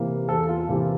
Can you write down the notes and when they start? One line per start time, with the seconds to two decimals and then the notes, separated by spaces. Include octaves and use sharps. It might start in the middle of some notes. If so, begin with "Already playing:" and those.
Already playing: C3 E3 A#3
0.28 E2 A4
0.49 F4
0.69 C3 E3 A#3 G4